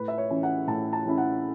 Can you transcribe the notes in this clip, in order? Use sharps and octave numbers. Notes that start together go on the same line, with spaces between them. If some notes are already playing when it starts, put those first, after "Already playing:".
Already playing: A2 B4
E5
C#5
E3 C#4 E4
F#5
A2 A5
A5
E3 C#4 E4
F#5